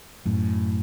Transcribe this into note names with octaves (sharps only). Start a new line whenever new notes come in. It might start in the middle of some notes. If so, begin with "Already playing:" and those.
F#2 A2